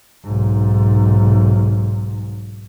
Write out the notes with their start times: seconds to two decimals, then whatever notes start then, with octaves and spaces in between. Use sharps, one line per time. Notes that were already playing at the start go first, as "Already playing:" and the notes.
0.24 B1 G#2